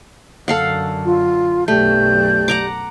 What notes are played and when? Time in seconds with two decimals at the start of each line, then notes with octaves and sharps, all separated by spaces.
0.48 F#2 D3 A4 F5 F#5
1.04 F4
1.68 B1 F#2 A3 G4 D5 G6
2.48 F#5 A#5 D6